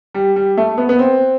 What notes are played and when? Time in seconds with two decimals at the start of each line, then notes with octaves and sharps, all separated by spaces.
0.14 G3
0.36 G3
0.57 A3
0.78 B3
0.89 B3
0.99 C4